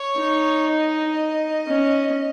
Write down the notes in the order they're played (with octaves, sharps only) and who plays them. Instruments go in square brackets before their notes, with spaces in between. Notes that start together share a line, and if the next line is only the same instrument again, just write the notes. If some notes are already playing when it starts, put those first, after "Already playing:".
Already playing: [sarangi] C#5
[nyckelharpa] D#4
[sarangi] D#5
[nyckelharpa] C#4